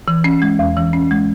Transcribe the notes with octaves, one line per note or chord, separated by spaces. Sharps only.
E3
C#4
G#3
E2
E3
C#4
G#3